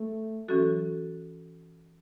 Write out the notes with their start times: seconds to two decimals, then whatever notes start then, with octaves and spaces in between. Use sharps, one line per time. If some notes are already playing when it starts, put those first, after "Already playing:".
Already playing: A3
0.48 E3 F#3 C#4 F#4 A4